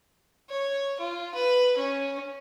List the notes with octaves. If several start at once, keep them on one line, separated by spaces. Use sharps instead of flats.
C#5
F4
B4
C#4